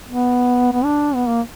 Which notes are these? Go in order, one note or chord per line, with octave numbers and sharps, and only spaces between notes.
B3
B3
D4
B3
A#3